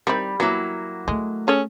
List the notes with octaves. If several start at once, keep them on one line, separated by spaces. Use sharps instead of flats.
D#3 G3 C4 E4
E3 F#3 A#3 E4
G#3 A3
C#4 G#4 A4 C#5